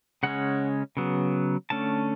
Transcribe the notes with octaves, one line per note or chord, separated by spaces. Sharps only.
C#3 G#3 C#4 F#5
C#3 F#3 B3
D3 A3 C#4 A5